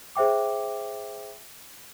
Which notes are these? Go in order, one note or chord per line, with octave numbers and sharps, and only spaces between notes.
G#4 C5 E5 G5 D6